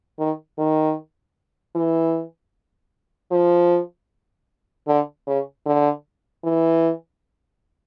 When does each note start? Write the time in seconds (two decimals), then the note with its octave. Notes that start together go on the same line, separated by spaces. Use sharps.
0.19 D#3
0.58 D#3
1.75 E3
3.31 F3
4.87 D3
5.27 C#3
5.66 D3
6.44 E3